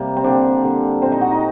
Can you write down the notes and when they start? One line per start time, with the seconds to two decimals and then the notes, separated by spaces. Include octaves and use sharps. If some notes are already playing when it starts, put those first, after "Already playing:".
Already playing: C3 G3 A#3
0.17 C4
0.24 D3 G3 A#3 D4
0.64 D3 G3 A#3
1.01 A#2 A3 C4 C5
1.12 D#4 D#5
1.21 F#4 F#5
1.31 D#4 D#5